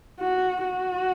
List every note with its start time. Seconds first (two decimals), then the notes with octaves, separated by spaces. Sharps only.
0.20 F#4
0.64 F#4